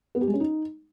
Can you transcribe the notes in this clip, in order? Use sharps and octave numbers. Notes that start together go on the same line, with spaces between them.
B3
G4
G#3
C#4
D#4